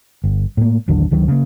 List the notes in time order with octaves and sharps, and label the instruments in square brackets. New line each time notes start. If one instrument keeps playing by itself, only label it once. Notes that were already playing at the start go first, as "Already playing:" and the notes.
[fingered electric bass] G1
A2 A#3
A1 D#2 D3 F#3
D2 D#3 F#3
C#3 A#3